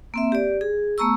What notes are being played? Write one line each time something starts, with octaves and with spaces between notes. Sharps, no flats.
A#3 C4 E5
G4 D5
G#4
A3 B3 A#5 C#6 E6